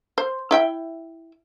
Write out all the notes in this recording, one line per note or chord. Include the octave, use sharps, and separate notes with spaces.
C5
E4 E5 G5